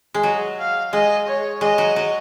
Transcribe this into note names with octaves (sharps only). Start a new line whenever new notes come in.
G#3
F#3 D#5
F5
G#3 D#5
C#5
G#3 D#5
F#3
F#3